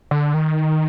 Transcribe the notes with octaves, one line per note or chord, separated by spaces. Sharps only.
D3
D#3